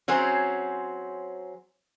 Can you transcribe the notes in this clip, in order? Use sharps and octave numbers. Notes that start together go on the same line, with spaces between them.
F#3 C4 C#4 G#4 C5